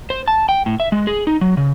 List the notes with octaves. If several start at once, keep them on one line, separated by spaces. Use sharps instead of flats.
C5
A5
G5
A2
E5
G#3
G#4
D#4
F#3
C#3